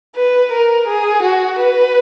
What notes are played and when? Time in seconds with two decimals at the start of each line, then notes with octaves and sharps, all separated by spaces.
0.15 B4
0.52 A#4
0.88 G#4
1.23 F#4
1.59 B4